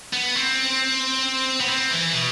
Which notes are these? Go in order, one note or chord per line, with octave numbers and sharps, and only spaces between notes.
B3
C4
B3
C4
E3
B2